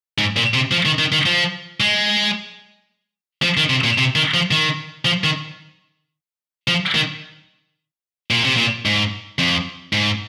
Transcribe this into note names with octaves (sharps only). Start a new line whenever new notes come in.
G#2
A#2
C3
F3
D#3
D#3
D#3
F3
G#3
F3
D#3
C3
A#2
C3
D#3
F3
D#3
F3
D#3
F3
D#3
A#2
C3
A#2
G#2
F2
G#2